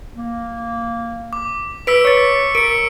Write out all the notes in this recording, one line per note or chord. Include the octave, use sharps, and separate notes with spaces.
A#3
D6
B4 E6 B6 D7
C#5 C#6 A6
A#4 C#7 D7